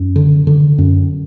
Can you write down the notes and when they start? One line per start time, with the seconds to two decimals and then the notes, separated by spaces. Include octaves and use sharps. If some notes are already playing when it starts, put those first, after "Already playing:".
Already playing: F#2
0.16 D3
0.47 D3
0.78 F#2